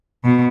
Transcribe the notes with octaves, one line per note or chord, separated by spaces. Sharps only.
B2